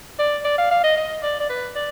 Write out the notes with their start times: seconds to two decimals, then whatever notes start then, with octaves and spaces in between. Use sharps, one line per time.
0.19 D5
0.45 D5
0.58 F5
0.71 F5
0.84 D#5
0.97 D#5
1.23 D5
1.40 D5
1.49 B4
1.75 D5